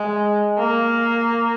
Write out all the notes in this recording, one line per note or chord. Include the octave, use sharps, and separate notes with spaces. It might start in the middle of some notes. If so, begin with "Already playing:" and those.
Already playing: G#3
A#3